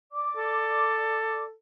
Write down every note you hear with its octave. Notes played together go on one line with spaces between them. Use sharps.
D5 D6
A4